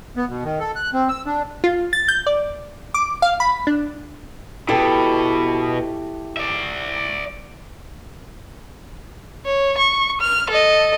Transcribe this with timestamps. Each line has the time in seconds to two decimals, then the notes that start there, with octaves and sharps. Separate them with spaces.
0.17 B3
0.29 B2
0.44 D#3
0.60 A4
0.76 F#6
0.94 C4
1.09 E6
1.26 D4
1.64 F4
1.93 A6
2.08 G6
2.27 D5
2.94 D6
3.22 F5
3.40 B5
3.67 D4
4.69 B2 E4 G4 A4
6.37 D5 E5
9.45 C#5
9.78 C#6
10.21 F6
10.50 A4 D#5